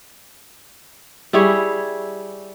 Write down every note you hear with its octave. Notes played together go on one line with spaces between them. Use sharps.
G3 E4 G#4 C#5